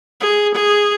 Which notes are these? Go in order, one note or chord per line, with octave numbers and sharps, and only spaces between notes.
G#4
G#4